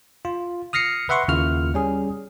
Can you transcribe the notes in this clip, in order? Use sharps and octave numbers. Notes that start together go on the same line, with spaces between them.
F4
D#6 F6 A#6 C7 C#7
B4 E5 F#5 C6 C#6
D#2 C#3 A#3 E4 F4 F6
G3 C#4 G#4